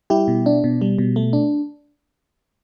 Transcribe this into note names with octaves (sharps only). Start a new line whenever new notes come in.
G3 E4 G4
B2
D4
B2
G3
B2
A3
D4